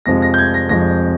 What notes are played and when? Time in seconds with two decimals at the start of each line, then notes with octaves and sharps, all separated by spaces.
0.06 F2 C3 F3 G#3 A#6
0.22 A#6
0.34 G6
0.38 G#6
0.54 A#6
0.69 F2 C3 F3 G#3 A#6